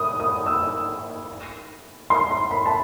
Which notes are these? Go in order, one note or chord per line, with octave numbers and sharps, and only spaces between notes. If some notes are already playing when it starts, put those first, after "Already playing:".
Already playing: D#6
D#6
E6
C6
C6
B5
A5